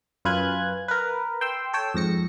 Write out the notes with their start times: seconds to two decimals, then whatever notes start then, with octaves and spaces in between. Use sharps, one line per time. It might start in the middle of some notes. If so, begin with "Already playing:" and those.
0.25 F#2 F4 B4 G#5 F#6 G#6
0.88 A#4 B4
1.41 G5 C6 E6
1.73 A4 C#5 G5 E6
1.94 F2 G#2 A#6 C#7